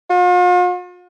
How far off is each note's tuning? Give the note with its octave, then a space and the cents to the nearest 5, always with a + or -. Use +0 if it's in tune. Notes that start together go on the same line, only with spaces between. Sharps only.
F4 +45